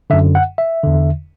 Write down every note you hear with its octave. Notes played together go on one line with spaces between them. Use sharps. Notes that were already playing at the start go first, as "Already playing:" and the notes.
F#2 D3 E5
F#5
E5
E2 D3